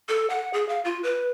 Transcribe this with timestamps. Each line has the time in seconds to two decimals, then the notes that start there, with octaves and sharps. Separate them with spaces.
0.09 A4
0.30 F#5
0.54 G#4
0.69 F5
0.85 F4
1.03 B4